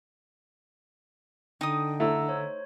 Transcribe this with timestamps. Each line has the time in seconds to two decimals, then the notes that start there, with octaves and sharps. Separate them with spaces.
1.61 D3 D#4 G5 D#6
2.00 A3 E4 F#5 A#5 E6
2.29 C5 C#5